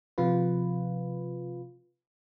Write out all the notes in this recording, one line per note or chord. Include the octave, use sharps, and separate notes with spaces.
C3 F3 F4 B4